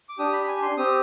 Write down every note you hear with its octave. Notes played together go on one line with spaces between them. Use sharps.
D6
D4 G4 D#6
B5
B5
G#5
C6
C4 G4 D#6